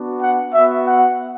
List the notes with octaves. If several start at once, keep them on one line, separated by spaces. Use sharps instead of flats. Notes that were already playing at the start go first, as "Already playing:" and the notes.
Already playing: B3 D4 F#4
F#5
B3 F#4 E5
F#5